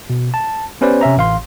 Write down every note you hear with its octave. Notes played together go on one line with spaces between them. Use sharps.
B2
A5
B3 C#4 G4 B4 C5 D5
C3 C#4 E5 A#5
A1 F5 C6